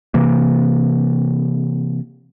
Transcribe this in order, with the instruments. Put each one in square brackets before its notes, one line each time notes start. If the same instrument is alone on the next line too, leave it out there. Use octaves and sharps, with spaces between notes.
[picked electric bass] C3 E3 A#3